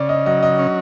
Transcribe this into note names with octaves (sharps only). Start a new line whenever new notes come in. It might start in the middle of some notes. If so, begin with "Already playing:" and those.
Already playing: C#3 D5
D#5
F#3 D#5
D#5
C#4